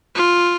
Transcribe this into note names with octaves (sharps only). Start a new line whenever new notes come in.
F4